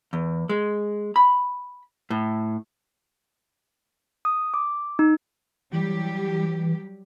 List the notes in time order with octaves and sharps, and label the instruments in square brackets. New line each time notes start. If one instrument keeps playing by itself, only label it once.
[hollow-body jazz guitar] E2
G#3
B5
A2
[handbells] D#6
D6
D#4
[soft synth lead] E3 [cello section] F#3 G3 G4